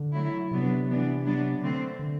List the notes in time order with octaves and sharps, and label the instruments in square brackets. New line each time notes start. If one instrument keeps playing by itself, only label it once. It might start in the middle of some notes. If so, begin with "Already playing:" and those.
Already playing: [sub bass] D3
[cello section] F#3 A3 E4
[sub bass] C3 [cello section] F#3 B3 D4
[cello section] E3 B3 D4
F#3 B3 D4
D3 A3 C4
[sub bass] D3